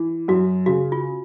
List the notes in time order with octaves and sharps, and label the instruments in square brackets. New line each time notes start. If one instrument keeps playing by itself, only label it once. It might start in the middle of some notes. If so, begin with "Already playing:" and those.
Already playing: [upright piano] E3
[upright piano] F#2 [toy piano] F#4
[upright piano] C#3 [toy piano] F#4
[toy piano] F4